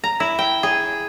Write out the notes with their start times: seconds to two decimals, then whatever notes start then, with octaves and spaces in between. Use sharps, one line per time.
0.04 A#5
0.20 E4
0.39 G5
0.63 G#4